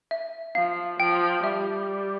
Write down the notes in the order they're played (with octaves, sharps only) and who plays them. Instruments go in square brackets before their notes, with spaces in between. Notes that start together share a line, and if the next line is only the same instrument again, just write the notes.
[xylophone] E5
[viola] F3 [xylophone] F5
[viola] F3 [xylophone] G5
[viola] G3 [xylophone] E5